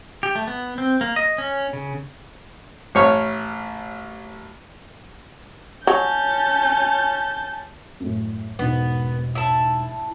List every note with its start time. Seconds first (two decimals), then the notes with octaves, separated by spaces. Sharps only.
0.23 G4
0.35 A3
0.48 B3
0.78 C4
1.01 A#3
1.16 D#5
1.38 C#4
1.73 C#3
2.95 A1 C#5 F6
5.87 F#3 C#4 A5 G6
8.00 F#2 A2
8.59 E1 G#2 B3
9.35 E4 A5